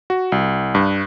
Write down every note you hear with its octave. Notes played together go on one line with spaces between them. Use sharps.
F#4
C2
G2